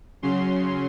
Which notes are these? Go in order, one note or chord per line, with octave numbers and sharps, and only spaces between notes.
C#3 F#3 C#4 C6